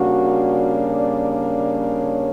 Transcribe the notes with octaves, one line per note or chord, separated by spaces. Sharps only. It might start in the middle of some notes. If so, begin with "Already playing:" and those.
Already playing: C#3 G3 A#3 D4 F#4
D5
D5
C#5